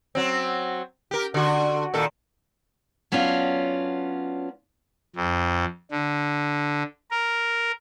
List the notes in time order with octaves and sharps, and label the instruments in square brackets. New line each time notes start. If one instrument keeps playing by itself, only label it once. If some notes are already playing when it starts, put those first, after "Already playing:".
[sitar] F#3 C4
G4 A#4
D3 F#4
A#2 D#3 A4
[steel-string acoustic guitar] F#3 B3 C#4 D4 F4
[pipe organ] F2
D3
A#4